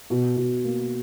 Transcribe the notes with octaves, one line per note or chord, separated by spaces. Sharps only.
B2
B2
A#3